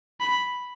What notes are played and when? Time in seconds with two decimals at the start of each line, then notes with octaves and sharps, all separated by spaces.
0.20 B5